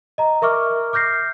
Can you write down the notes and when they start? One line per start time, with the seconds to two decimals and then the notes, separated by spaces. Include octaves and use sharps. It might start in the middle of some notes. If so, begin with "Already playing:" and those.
0.18 D#5 A#5
0.42 A#4 E5 C#6 D6 F6
0.93 D6 F6 G6 A#6 C7